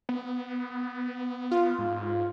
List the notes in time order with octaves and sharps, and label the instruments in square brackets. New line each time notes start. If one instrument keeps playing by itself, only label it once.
[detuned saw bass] B3
[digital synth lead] F4
[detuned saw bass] G#2